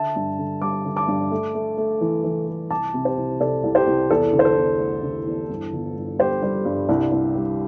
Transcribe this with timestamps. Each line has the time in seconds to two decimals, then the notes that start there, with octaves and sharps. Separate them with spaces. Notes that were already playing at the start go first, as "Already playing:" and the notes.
Already playing: D3 E5 A5
0.16 G2
0.39 D3
0.62 G3 A5 D6
0.85 D3
0.96 A5 D6
1.08 G2
1.31 A3
1.55 A3
1.78 A3
2.01 E3
2.24 E3
2.48 A3
2.70 C2 A5 D6
2.94 C3
3.05 G4 C5
3.17 C2
3.40 C3 A4 D5
3.64 C2
3.75 G4 C5
3.87 C2
4.10 E2 A4
4.33 D3
4.39 C5
4.45 A4
4.57 E2
4.79 A3
5.03 D3
5.26 E2
5.49 G2
5.73 G1
5.96 G2
6.19 G3 G4 C5
6.43 G3
6.65 G2
6.89 C2
7.12 C2
7.35 G3